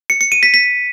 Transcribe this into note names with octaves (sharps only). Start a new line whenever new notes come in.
C#7
C#7
D#7
B6
B6